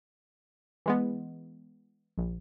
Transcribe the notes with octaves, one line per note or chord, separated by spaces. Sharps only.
E3 G#3 B3
A#1